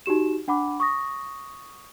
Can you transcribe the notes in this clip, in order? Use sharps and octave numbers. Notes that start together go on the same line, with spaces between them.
D#4 F#4 G4 E7
D4 F#5 B5 D6
C#6 D#6 A#6